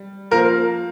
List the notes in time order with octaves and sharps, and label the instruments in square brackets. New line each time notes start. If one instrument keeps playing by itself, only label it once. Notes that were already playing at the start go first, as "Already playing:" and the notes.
Already playing: [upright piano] G3
[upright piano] F3 A#3 F4 C5 [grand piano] A#4